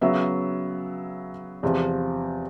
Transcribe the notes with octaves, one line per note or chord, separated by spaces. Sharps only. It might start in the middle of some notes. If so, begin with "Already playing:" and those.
C#3 F#3 B3 E5
E2 C3 F3